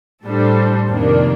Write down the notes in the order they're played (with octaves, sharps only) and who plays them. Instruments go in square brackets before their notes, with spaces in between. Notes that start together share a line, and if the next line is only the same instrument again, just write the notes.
[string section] A2 G3 D4 A4 C5
F2 C3 D#3 A#3 D4